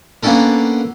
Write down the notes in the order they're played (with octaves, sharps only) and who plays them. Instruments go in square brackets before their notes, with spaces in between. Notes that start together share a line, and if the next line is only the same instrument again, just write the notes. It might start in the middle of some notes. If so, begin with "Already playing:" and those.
[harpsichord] A#3 B3 C#4 D4 A4 A#4